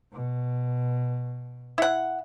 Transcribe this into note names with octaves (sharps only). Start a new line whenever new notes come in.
B2
E4 F#5